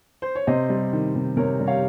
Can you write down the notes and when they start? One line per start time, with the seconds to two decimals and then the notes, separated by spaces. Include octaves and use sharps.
0.22 C5
0.35 C#5
0.47 C3 C5 D#5
0.69 G3
0.93 D#3
1.15 C3
1.37 C3 A#4 C#5
1.60 G3
1.67 C#5 F5